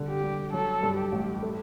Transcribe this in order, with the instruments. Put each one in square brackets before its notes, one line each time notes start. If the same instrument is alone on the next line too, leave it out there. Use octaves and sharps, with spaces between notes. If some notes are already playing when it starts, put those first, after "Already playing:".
Already playing: [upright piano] D3 G3
[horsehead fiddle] G4
[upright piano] G3
[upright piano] F#3 [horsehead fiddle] A4
[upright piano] G2
[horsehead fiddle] G4
[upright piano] A1
A3